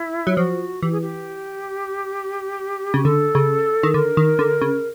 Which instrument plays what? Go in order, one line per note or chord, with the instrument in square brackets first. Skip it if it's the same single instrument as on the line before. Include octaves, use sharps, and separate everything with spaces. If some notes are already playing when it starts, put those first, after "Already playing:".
Already playing: [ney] E4
[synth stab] F#3
[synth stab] F3 [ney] F#4
[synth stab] E3 [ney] G4
[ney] G#4
G4
[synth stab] C#3
[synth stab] D3 [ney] A4
[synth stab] C#3
D#3
[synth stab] D3 [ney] A#4
[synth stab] D#3
D3
C#3